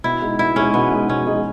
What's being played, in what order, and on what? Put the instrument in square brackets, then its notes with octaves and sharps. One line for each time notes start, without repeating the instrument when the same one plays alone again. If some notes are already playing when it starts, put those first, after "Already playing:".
[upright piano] B2 [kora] E4
[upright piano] G#3 D#4 G#4
[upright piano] B2 [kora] E4
[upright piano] G#3 D#4 G#4 [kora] C#4
[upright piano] B2 [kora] B3
[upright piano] G#3 D#4 G#4
[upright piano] B2 [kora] C#4
[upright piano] G#3 D#4 G#4